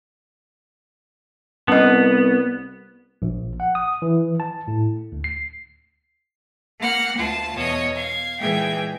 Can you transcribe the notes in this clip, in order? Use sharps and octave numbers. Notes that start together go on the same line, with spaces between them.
C2 B3 C#4 D#5
A#1
F#5
D#6
E3
A5
A2
D2
C7
A#3 F#5 F6
D2 F4 A5
E2 B2 C#5 D#5
F5 G#6
A#2 E3 G#3 G#4 G5 G#6